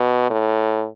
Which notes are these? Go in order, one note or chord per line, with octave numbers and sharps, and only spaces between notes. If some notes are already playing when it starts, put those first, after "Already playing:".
Already playing: B2
A2